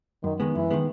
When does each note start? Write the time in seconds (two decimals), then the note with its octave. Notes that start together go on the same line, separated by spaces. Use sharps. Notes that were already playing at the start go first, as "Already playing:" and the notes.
0.24 F#2 D#3
0.40 D#3 G#3 B3
0.55 F#2 E3
0.71 D#3 G#3 B3